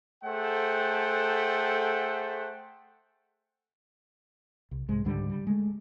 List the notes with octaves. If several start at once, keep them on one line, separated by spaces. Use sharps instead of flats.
A3 G#4 A4 C5 F#5 G5
C2
C2 G#2 G#3
C#2 G#2 D3 G3
G3
G#3 A3